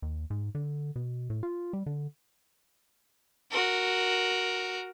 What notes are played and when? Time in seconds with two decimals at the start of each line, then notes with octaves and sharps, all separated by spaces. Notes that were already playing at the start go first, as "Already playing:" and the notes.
0.02 D#2
0.30 G#2
0.55 D3
0.96 B2
1.30 A2
1.43 F4
1.73 G3
1.86 D3
3.51 F#4 A#4